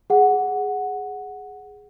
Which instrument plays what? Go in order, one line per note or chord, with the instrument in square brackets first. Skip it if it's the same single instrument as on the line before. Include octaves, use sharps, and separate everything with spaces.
[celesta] G#4 F#5